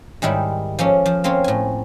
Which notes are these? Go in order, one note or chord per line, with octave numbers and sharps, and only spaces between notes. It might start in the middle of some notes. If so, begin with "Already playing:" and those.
G#2 D#3 G3 E4
F3 A#3 C#4 A4
F3
A#3 C4 C#4 F4
A2 G#5